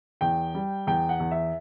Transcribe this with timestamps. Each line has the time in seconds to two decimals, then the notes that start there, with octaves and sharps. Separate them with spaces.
0.21 E2 G5
0.54 G3
0.87 E2 G5
1.09 F#5
1.20 E2
1.31 E5